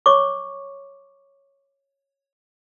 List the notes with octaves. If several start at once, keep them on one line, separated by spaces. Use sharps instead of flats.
C#5 C#6 D6